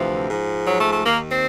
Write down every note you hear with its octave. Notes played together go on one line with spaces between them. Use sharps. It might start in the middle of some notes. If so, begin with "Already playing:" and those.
Already playing: D2 C3 E3 F3
G#2 F3
F#3
A3
A3
D#2 D#3 A#3
C4